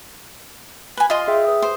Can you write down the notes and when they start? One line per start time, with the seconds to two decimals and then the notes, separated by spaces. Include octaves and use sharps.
0.97 B4 G#5
1.10 F4 D#5 C6
1.28 G#4 E5 G5
1.45 B4 D#6
1.62 C5